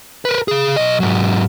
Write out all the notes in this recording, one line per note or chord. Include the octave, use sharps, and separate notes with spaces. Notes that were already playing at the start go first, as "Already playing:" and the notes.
A#4 B4
C#3 G#4
B1 D#5
G#2 F#3